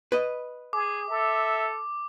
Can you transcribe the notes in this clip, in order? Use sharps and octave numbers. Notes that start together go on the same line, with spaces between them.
B4 D#5
G#4 D6
A4 E5